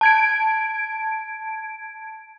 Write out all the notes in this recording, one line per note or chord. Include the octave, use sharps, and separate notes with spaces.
A5 G#6 D7